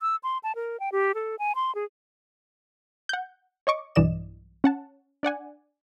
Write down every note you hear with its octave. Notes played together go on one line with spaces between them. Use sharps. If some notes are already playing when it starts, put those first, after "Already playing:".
E6
C6
A5
A#4
G5
G4
A4
G#5
C6
G#4
F#5 G6
C#5 D#5 C#6 D6
B1 G2 E3 D5 D#5 E7
C#4 F#5 A5
D4 D5 F#5 G#5